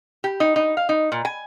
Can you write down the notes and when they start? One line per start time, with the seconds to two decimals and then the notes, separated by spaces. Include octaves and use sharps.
0.24 G4
0.40 D#4
0.56 D#4
0.77 F5
0.89 D#4
1.12 A#2
1.25 G#5